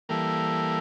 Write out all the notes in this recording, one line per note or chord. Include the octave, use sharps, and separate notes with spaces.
E3 G3 A#3 A4